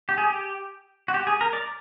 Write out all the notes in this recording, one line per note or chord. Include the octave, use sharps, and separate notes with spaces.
G4
G#4
G4
F#4
G4
G#4
A#4
D5